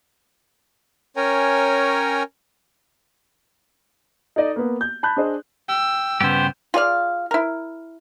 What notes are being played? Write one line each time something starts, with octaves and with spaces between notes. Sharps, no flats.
C#4 A#4 C#5 G5 G#5 A#5
D#4 A4 D5 D#5
A#3 B3
G6
A5 B5 F#6 G6
D4 G#4 C5 D#5
G5 E6
G2 C#3 B3 G4 C5
F4 G#4 D5 F5
E4 A#4